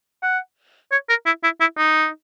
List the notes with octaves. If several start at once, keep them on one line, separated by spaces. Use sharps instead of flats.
F#5
C#5
A#4
E4
E4
E4
D#4